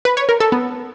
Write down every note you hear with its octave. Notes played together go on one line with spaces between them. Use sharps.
B4
C#5
A#4
A4
B3